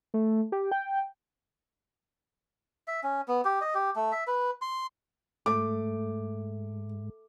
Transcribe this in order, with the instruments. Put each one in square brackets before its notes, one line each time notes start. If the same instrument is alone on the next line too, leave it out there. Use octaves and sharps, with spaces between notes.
[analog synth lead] A3
G4
G5
[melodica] E5
C#4
B3
G4
D#5
G4
A3
E5
B4
C6
[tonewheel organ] G#2 [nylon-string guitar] A3 [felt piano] D6